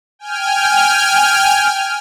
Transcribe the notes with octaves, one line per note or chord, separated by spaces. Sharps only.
G5 G#5 F6